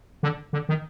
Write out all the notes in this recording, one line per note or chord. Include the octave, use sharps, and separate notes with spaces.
D3
D3
D#3